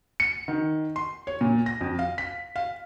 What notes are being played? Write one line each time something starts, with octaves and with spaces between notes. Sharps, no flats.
C#7
D#3
C6
C#5
A#2
A#6
F2
F5
B6
F5